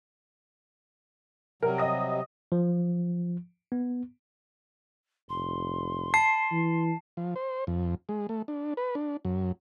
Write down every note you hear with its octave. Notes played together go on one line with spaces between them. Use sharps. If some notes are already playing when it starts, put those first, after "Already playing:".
C3 F#3 G3 A#4
D#5 D#6 A#6
F3
B3
F1 C6
A5 C7
E3
F3
C5
F2
G#3
A3
D4
B4
D4
F#2